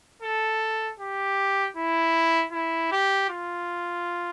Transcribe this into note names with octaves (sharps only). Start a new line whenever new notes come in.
A4
G4
E4
E4
G4
F4